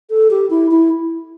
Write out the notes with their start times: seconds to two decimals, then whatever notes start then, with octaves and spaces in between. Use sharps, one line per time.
0.10 A4
0.31 G4
0.50 E4
0.71 E4